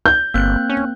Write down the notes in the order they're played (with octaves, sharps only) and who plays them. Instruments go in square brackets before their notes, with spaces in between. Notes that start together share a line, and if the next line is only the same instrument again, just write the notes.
[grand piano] G6
[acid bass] G1 [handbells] A#3 C4 F#6
[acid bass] C#4